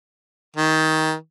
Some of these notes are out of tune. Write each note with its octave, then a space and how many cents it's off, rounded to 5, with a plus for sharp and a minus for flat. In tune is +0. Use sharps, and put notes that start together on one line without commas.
D#3 +20